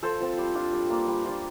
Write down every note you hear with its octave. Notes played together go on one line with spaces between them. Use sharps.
F3 A4 C5
C4 F4
G3
D4 F4
G3
A#3 D4
G3
D4 F4